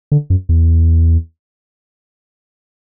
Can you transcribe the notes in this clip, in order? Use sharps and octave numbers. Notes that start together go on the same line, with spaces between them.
D3
F#2
E2